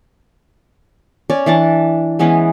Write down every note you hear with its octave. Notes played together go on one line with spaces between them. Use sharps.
C#4 C#5 D5
E3 D4 A5
E3 G#3 B3 C#4